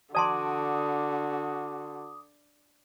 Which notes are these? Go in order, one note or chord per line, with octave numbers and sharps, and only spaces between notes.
D3 F#4 D5 A5 C6 D6 D#6